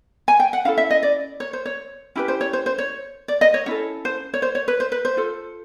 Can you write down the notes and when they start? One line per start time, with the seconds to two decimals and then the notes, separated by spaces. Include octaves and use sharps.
0.28 G#5
0.40 G5
0.53 F#5
0.65 C#4 E4 A4 F5
0.78 E5
0.90 D#5
1.03 D5
1.40 C#5
1.53 C5
1.66 C#5
2.15 C#4 E4 G4 B4
2.28 C5
2.41 C#5
2.53 C5
2.66 C5
2.78 C#5
3.28 D5
3.41 D#5
3.54 C#5
3.66 C#4 E4 A4 C#5
4.05 C5
4.34 C#5
4.42 C5
4.55 C#5
4.68 B4
4.80 C5
4.92 B4
5.05 C5
5.17 F4 A4